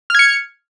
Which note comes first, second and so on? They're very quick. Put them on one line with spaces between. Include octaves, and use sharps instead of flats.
F6 G#6 C#7